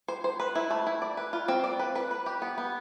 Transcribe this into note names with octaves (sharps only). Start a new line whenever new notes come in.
C5
C5
B4
E4
A3
E4
D5
B4
F4
C4
D5
B4
B4
B4
G4
B3
B3